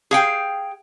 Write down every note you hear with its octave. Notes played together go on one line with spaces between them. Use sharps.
G#4 F5 G5